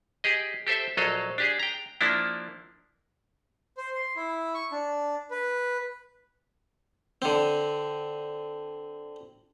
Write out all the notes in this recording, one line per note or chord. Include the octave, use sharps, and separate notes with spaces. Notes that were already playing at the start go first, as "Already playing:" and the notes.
G4 G#4 D#5
G4 A4 C5 E5
A#1 F#3 A4 D#5 F5
D4 G4 G#4
G5 A#5
F3 A#3 D4 E4
C5
C6
E4
C#6
D4
B4
D3 C4